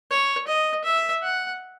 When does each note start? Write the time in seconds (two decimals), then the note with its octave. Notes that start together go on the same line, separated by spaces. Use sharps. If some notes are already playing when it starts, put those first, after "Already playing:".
0.10 C#5
0.47 D#5
0.84 E5
1.23 F#5